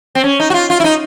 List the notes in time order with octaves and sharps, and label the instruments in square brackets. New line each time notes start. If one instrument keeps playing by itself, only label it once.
[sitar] C4
C#4
D#4
F#4
F4
F4
E4
D#4